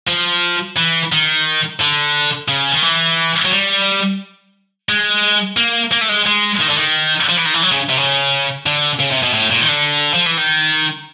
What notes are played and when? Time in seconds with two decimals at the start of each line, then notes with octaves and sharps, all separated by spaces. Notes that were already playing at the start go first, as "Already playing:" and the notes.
0.08 F3
0.77 E3
1.12 D#3
1.80 D3
2.48 C#3
2.72 D#3
2.83 E3
3.45 F#3
3.51 G3
4.89 G#3
5.57 A#3
5.92 A#3
6.01 A3
6.09 G#3
6.26 G#3
6.60 D#3
6.69 D3
6.76 D#3
7.29 F3
7.37 E3
7.45 D#3
7.54 E3
7.63 F#3
7.71 C#3
7.89 C3
7.97 C#3
8.66 D3
9.00 C#3
9.12 C3
9.24 B2
9.34 A2
9.52 A#2
9.61 D#3
9.69 D3
10.14 F3
10.26 E3
10.37 D#3